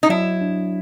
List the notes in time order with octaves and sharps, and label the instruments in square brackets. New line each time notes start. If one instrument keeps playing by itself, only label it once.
[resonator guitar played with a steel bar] D#4
[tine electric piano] F#3 [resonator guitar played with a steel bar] E4
[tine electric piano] D4